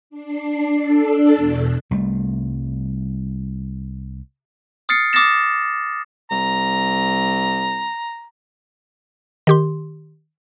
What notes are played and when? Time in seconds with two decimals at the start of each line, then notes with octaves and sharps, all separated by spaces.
0.10 D4 C7
0.78 D4 A4
1.33 E2 B2
1.91 C2 G3 A3
4.89 D#6 F6 A6 C7 C#7
5.13 D6 D#6 F6 A6 A#6 E7
6.31 C2 A#5
9.47 D#3 G4 C6